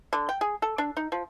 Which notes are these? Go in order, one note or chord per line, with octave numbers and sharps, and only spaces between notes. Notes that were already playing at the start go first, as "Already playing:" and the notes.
D3
G5
G#4
A4
D4
D#4
F3